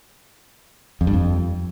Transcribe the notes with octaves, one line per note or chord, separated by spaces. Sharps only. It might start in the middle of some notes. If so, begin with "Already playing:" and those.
F2
G2
F2